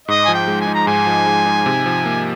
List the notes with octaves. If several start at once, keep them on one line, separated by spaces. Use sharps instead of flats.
G#2 D#5
F3 G#5
G5
G#3
G#5
D#4
A#5
G#2 G#5
F3
G#3
D#4
C3
F3
A#3